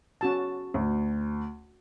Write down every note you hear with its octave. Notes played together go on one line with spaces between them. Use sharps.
C#4 F#4 A5
D2